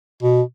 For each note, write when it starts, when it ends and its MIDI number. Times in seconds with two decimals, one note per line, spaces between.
0.23 0.42 47